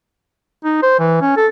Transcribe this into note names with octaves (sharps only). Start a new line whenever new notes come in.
D#4
C5
E3
C#4
A4